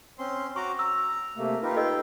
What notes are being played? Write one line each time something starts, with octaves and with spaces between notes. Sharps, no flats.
C4 C#4 C6
F#4 A#5 C#6 D6
A#5 E6
C3 A3 A#3
D#4 F4 G4 A#4 B4
A4 D#5 G5 E6